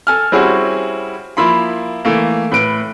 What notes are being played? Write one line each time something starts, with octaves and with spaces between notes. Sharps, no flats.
A4 G#5 F6
G3 C4 C#4 E4 F#4 G#4
F3 A#3 E4 B5 C6
E3 A3 A#3
A2 B4 D7